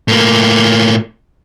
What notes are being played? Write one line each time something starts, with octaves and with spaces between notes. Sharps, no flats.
A2 A#3